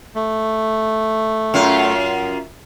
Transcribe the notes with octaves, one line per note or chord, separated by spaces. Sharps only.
A3
F#2 F4